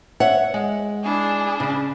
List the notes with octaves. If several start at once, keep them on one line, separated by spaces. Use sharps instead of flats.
C#5 E5 F#5
G#3
D4 E4 G#4
C#3